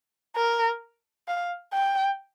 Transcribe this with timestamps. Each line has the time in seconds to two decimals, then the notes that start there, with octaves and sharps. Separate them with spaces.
0.36 A#4
1.28 F5
1.73 G5